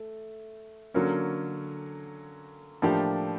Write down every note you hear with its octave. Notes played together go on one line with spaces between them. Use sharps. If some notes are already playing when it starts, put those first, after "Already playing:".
Already playing: A3
D3 F#3 A#3 C#4
A2 F3 A#3 D4 G4